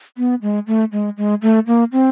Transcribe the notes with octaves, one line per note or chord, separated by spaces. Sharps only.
B3
G#3
A3
G#3
G#3
A3
A#3
C4